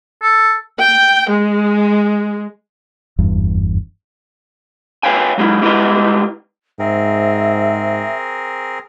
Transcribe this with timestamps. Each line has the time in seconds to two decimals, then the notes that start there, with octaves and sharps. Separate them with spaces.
0.22 A4
0.79 G5
1.30 G#3
3.18 F#1 E2 G2
5.03 B4 C#5 F5 G5 G#5
5.38 F#3 G#3 E4
5.62 G3 G#3 E4 A#4 B4 D#5
6.79 G#2 C4 G#4 A#4 E5